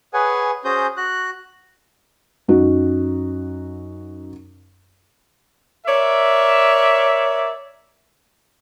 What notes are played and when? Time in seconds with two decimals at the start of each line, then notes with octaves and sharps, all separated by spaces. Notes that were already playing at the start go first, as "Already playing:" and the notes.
0.14 G#4 B4 C#5 F#5 G#5
0.65 C#4 F#4 G#4 C5 D#6 G6
0.97 F#4 F#6
2.48 F#2 D#4 F#4
5.87 A#4 C#5 D5 E5